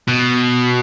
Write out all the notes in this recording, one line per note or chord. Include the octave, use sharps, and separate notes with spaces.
B2